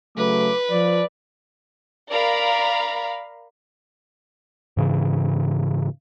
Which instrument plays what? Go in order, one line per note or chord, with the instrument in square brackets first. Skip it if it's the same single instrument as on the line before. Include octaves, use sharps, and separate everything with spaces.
[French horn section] C#3 F#3 A3 [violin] B4 [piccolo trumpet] D6
[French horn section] F3 [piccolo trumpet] D5
[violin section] A#4 D5 F5 A#5 B5
[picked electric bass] G#2 C#3 E3